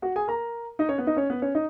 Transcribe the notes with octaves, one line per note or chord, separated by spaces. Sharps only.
F#4 F#5
G#4 G#5
A#4 A#5
D#4 D#5
C#4 C#5
B3 B4
D#4 D#5
C#4 C#5
B3 B4
C#4 C#5
D#4 D#5